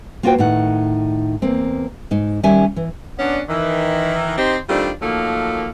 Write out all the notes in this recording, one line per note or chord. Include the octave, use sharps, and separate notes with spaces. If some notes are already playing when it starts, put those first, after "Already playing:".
A#3 F4 F#4 B4 C5 G5
A2 D#3 D#4 F#5
E2 A#3 C4
G#2 D#4
D#3 G3 C#4 A#4 E5 G#5
E3
B3 C#4 D4
D#3 E3
C4 D#4 G4 C5
D#3 G3 A3 C4 D4 F4
D#3 F3 F#3 A3 A#3